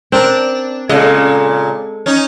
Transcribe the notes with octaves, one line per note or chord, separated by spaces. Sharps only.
C4 D4 A#4
A#2 C#3 G#3 A4 D#5
C#4 D#4